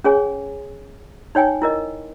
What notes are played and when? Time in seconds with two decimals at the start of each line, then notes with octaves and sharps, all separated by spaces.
0.04 C#4 G#4 C#5 G#5
1.35 D#4 C#5 G5 G#5
1.62 E4 A#4 D#5